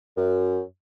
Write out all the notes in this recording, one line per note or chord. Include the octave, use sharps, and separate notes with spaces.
F#2